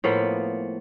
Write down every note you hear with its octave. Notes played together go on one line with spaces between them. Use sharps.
A2 F3 A#3 B3